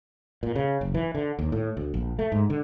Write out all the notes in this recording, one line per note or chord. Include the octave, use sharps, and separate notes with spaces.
A#2
C#3
F#1
E3
D3
D#2
A2
D2
A#1
A3
G#2
D3